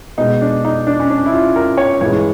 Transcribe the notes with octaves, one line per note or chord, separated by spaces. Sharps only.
B2 G#3 D#4
D4
D#4
D4
C#4
D4
E4
F4
A#4
C#5
G2 E3 G#3 C#5